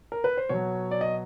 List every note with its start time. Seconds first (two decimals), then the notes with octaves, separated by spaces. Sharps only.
0.12 A#4
0.24 B4
0.37 C5
0.49 B2 F#3 C#5
0.91 D5
1.01 D#5